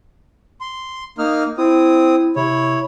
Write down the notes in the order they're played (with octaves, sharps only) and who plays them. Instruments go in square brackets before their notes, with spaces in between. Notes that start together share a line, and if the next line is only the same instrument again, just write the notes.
[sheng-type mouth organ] C6
[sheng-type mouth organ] A#3 D#4 F6 [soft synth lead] D#6
[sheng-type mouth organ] C4 D#6 [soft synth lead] E4
[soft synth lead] C3 [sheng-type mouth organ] E4 C#5